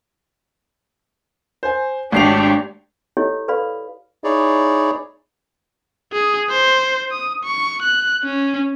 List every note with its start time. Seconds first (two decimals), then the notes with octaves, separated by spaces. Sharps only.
1.63 C5 G#5
2.12 G#1 G#3 A3 D4 G4 C#5 C7 F7
3.17 E4 G4 A4 C#5 D#5
3.48 A4 B4 D5 F5 B5
4.24 D#4 E4 G#4 C#5 D5
6.13 G#4
6.49 C5
7.11 D#6
7.44 C#6
7.82 F#6
8.23 C#4